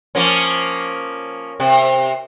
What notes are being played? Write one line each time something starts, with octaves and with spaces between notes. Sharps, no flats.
F3 A#3 C#4
C3